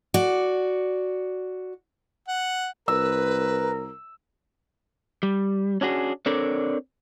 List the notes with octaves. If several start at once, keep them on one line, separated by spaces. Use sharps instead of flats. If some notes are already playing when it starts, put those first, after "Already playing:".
F#4 D5
F#5
C2 A#4 B4 E6
G3
C#4 D4 F#4 G#4
C4 D4 A4 A#4 C#5 D5